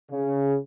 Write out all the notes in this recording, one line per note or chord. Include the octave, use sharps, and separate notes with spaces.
C#3